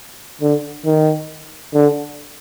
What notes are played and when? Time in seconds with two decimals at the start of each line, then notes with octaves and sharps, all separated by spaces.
0.41 D3
0.86 D#3
1.74 D3